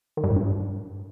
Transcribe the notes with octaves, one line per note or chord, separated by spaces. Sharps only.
D#3
G2
A2
G2